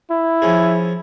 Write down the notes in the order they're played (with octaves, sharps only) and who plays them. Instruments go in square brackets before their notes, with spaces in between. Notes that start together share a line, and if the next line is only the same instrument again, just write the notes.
[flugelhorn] E4
[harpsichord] F3 C#4 G#4